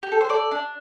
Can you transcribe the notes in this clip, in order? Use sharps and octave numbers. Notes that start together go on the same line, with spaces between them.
G4
A4
C5
A4 D5
D4